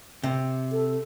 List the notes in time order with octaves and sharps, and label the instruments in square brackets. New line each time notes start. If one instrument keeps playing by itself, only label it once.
[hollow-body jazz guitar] C3
[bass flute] A4